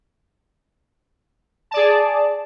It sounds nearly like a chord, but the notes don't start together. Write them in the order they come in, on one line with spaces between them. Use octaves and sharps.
A5 D5 G#4